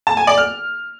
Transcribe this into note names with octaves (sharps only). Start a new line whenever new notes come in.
A5
G#5
D5
F6